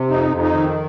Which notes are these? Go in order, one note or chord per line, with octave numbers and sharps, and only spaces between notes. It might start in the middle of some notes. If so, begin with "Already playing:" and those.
Already playing: C3
F2 D#4
F2
D#4
D#3